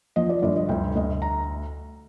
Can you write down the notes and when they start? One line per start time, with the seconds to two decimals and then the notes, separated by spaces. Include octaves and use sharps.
0.16 F3 D#5
0.29 D5
0.43 G1 D5
0.56 D#5
0.69 D2 G5
0.95 D2 D#5
1.22 A#5